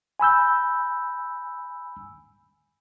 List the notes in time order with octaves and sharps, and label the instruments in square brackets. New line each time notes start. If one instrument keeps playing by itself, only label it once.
[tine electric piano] G#5 B5 E6 G6